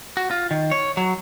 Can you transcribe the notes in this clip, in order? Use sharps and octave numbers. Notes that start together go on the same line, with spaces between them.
F#4
F4
D#3
C#5
F#3